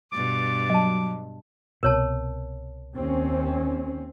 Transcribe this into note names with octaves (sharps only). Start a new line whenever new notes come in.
G2 B2 D6 A6
F#3 D#5 A5
C2 B2 A#4 C#5 A5
D#2 C4 C#4